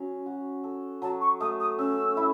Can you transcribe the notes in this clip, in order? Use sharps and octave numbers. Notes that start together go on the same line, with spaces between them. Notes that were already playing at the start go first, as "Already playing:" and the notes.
Already playing: F#3 C#4
F#4
A4
F#3 A5
C#6
A3 D#6
D#6
C#4 E6
E4